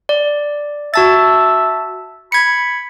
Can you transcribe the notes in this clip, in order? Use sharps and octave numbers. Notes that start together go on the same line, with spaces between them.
D5
F#4 E5 A5 A6
B5 G#6 C#7